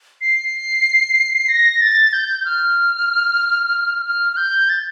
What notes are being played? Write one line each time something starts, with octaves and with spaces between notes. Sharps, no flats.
C7
A#6
A6
G6
F6
F6
F6
G6
A6